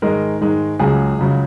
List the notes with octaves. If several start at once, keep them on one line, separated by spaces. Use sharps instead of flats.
G#2 D#3 G#3 A#4
G#2 D#3 G#3
C#2 C#3 F#3 G#4
C#2 C#3 F#3